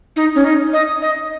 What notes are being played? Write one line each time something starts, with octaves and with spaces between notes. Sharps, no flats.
D#4
C#4
D#4
D#5
D#5